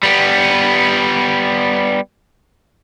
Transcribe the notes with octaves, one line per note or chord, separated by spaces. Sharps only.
G3 B3